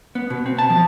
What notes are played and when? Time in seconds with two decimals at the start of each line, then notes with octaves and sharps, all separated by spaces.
0.15 B3
0.30 B2
0.46 C4
0.58 A5
0.70 F3